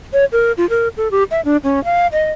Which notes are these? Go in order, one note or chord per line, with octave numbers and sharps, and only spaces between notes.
C#5
A#4
F4
A#4
A4
G4
E5
D4
C#4
F5
D#5